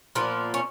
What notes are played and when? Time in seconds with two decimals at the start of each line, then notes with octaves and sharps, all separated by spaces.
0.15 A#2 F3 A#3 B3
0.54 C#4